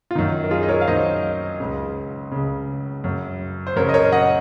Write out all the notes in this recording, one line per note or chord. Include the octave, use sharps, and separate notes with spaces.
F4
F#2 D#3 D#4
A#4
F4 G#4
D#5
A#4 C#5
F5
F#2 D#3 C5 D#5
C#2 C#3
C#2 C#3
F#2 C#3
C5
F#2 C#3 A#4 C#5
D#5
A#4 C#5
D#5 F#5